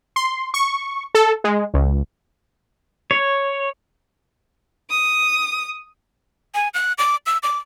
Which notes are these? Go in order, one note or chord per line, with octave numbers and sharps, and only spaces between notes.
C6
C#6
A4
G#3
C#2
C#5
D#6
G#5
F#6
D6
E6
D6